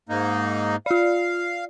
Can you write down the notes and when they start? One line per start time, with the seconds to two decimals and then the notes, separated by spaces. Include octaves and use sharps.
0.09 G#2 A#3 D#4
0.86 F4 D5 F5